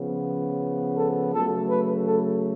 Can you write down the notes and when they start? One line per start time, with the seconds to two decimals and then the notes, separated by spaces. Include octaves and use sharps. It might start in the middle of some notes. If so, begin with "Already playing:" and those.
Already playing: C#3 F3 B3
0.97 A4
1.33 C#3 F#3 A3 A4
1.69 B4
2.07 A4